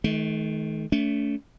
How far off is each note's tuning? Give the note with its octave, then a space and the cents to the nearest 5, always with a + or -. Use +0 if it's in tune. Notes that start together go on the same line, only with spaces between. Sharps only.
D#3 +20 A3 -40
A3 +0 C#4 +45